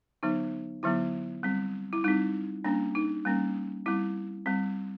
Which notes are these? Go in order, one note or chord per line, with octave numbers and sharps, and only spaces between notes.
D3 F#3 B3 D#4
D3 F#3 B3 E4
G3 C4
E4
G3 C4 D#4
G3 A#3 C#4 D4
D#4
G3 A#3 C#4
G3 C4 E4
G3 C4